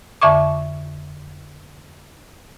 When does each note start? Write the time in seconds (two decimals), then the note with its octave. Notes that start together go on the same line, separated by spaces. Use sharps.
0.22 F2 D3 E5 C#6 D6